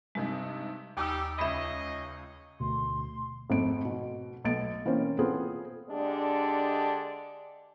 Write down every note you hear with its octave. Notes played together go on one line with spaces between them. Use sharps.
G2 C3 G#3 D#4
D#2 G3 D#4 G4 G#5 D6 E6
C#2 G#4 C#5 D#5 E5 B5 B6
D2 B2 C6
G#1 F2 A3 D7
B2
B1 A3 A6 D7
E3 A#3 C4 C#4 C5
B3 C4 F4 G#4 A4
D3 G#3 D4 G4 D5